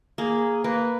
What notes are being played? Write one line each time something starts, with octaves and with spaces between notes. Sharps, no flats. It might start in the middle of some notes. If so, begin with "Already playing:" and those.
A#3 G#4
A#3 B4